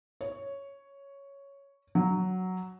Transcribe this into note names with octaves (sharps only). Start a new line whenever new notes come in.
C#5
F#3